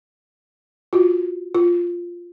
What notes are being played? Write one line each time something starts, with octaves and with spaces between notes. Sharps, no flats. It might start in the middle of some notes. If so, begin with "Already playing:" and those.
F4 F#4
F4